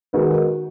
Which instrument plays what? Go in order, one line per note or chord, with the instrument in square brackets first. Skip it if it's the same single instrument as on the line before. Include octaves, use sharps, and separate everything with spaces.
[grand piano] D#3 G#3 D#4 F#4 B4